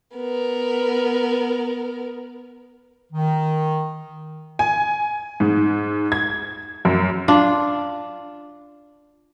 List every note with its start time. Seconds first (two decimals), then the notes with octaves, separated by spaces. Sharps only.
0.17 B3 A#4
3.13 D#3
4.59 G#5
5.40 G#2
6.12 G#6
6.85 F#2
7.28 D4 F4